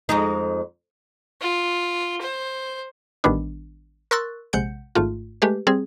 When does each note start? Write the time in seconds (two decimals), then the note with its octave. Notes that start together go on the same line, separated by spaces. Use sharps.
0.09 F2 G#3 D#4
1.41 F4
2.21 C5
3.24 A1 D#3 G3 B3 D4
4.11 A#4 C6 C#6 E6 F#6 A6
4.53 A#1 C3 G#3 F#5 G6 C#7
4.95 G#1 G#2 A3 F4
5.42 G#3 A3 G4 B4
5.67 G3 C4 G#4